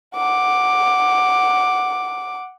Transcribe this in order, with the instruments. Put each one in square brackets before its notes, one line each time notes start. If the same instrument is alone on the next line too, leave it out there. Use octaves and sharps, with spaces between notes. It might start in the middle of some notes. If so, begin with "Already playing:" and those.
[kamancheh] F#5 D6